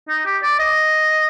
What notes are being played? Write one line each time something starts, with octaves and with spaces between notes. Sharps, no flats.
D#4
G4
D5
D#5